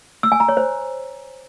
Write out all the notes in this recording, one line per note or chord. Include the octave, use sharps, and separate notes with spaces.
E6
G#5
A#5
C#5
C5